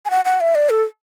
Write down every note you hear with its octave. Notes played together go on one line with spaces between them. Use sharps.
G#5
F#5
F#5
E5
D5
A4